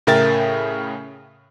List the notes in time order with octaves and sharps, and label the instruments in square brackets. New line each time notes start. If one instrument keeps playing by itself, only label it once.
[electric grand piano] A2 C#3 A#4 E5 G5 A6